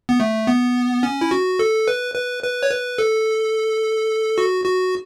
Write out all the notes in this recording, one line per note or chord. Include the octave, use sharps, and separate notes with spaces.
B3
A3
B3
C#4
E4
F#4
A4
B4
B4
B4
C#5
B4
A4
F#4
F#4